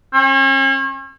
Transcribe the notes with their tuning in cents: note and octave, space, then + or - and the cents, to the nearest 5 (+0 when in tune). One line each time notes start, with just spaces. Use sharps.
C#4 -40